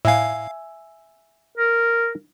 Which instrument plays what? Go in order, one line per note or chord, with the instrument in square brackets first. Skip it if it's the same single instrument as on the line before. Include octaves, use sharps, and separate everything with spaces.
[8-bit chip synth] A2 F5 [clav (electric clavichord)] E5 G#5
[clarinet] A#4